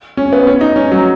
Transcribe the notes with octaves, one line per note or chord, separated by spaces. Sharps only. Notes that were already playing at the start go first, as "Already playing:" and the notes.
C#4
B3
C#4
D#4
C#4
F#3